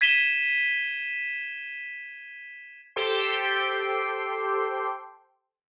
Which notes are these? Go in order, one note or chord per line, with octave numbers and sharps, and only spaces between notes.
G#6 B6 D#7 E7 G7
G4 A4 C5 G5 C6